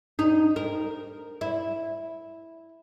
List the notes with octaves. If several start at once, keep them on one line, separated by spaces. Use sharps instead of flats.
D#4
A#4
E4